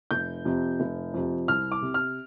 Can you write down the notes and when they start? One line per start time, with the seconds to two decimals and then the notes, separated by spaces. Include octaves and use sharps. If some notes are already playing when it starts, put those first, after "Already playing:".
0.11 F1 G6
0.45 F2 C3
0.80 F1
1.14 F2 C3
1.48 C2 F6
1.72 D6
1.82 C3
1.94 F6